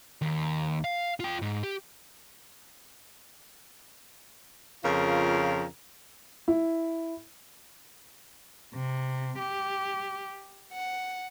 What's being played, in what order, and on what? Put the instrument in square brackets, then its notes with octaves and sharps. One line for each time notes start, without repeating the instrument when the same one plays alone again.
[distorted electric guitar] D#2
F5
F4 G5
G#2
G4
[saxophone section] F2 C#3 F4 A#4
[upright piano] E4
[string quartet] C3
G4
F#5